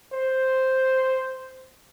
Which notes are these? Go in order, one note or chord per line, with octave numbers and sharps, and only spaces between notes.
C5